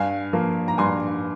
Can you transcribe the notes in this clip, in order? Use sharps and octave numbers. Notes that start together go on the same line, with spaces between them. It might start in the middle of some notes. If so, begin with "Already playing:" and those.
Already playing: G2 F5 G#5
F3 A#3
A#5
G2 G#5 C6